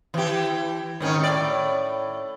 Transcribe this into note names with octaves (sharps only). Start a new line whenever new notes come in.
E3 G4
G#2 D#3 C#4
A2 D5